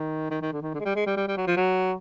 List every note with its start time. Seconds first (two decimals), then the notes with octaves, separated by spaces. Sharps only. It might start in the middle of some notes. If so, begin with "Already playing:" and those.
Already playing: D#3
0.31 D#3
0.42 D#3
0.53 D3
0.62 D#3
0.74 D3
0.80 G#3
0.85 G3
0.96 G#3
1.06 G3
1.17 G3
1.28 G3
1.37 F#3
1.47 F3
1.57 F#3